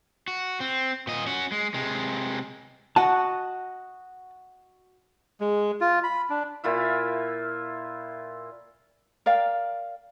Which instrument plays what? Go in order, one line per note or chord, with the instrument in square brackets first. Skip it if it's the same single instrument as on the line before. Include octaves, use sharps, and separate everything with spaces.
[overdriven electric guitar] F#4
C4
A#2 D#5
C#4 F#4
G#3
C3 G#3
[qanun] F#4 D#5 [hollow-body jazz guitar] F#5 A5
[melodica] G#3
F4
B5
D4
[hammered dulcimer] A#2 E4 F4 E5
[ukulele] A#4 D5 F5 G5